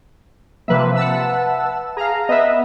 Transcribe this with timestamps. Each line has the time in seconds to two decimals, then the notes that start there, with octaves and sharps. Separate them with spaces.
0.68 C3 F3 A#3 B4 E5
0.95 F#5 A5 E6
1.97 G#4 F5 A#5
2.29 B3 B4 D#5 E5